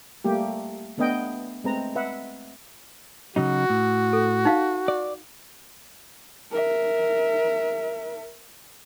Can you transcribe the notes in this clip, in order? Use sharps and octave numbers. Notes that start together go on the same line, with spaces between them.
G3 A3 A#3 G4
A3 B3 D4 B4 D#5 G5
G#3 A3 C4 B4 A#5
B4 E5 F#5
C#3 F#3 D#4 F#4
A2
A4
D#4 F5
D5
A#4 E5